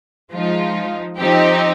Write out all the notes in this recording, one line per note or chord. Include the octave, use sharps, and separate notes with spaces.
F3 G#3 D#4 F4
F3 C4 D#4 G4